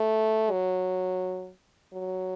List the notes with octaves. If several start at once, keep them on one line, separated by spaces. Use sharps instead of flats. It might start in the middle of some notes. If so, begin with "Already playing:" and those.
Already playing: A3
F#3
F#3